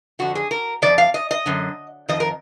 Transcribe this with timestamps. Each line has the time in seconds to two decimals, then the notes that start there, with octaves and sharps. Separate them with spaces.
0.19 F2 D3 F#4
0.35 G#4
0.51 A#4
0.82 F2 D#3 D5
0.98 F5
1.14 D#5
1.31 D#5
1.46 F#2 D3
2.08 F2 D#3 D#5
2.20 A#4